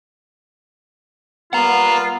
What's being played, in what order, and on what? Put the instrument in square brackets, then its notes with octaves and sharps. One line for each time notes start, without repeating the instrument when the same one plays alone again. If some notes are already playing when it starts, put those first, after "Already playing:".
[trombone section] G3 A#3 B3 [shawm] F4 [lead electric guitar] F#5 A#5